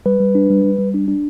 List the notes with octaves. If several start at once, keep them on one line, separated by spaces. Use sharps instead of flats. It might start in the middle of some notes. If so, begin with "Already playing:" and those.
G3 B4
G3
D4
G3
G3
G3
D4
D4